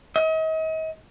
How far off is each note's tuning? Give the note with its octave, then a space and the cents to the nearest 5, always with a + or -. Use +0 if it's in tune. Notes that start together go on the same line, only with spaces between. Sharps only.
D#5 +40